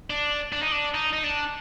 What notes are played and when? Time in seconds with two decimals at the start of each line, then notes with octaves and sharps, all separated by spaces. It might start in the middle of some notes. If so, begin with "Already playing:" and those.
0.10 D4
0.53 D4
0.62 D#4
0.72 D4
0.94 D#4
1.13 D#4
1.23 D4